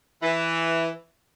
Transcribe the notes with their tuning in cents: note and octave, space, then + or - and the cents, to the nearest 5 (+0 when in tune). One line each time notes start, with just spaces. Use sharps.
E3 +5